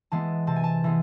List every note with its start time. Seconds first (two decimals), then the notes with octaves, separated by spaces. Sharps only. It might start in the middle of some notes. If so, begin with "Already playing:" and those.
0.12 E3 G#3 B3 A5
0.47 C3 A5
0.56 G#5
0.64 A5
0.84 E3 G#3 B3